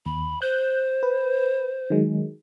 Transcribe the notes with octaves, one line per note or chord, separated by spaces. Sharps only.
D#2 B5
C5 F#6 G6
B4
D#3 F#3 G#3